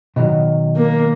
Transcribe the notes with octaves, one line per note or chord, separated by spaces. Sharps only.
B2 D#3 F#3
A#3